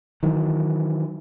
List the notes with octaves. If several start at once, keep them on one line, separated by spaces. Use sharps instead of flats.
D#3 E3 F#3